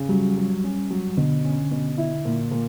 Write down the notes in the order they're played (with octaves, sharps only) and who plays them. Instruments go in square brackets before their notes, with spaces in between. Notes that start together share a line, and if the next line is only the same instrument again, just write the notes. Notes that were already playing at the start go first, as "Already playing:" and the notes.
Already playing: [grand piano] C#3
[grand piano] F#3 [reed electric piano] G3
[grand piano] F#3
C#4
F#3
[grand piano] B2 [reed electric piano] D3
[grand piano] C#4
B2
E4
A#2
A#2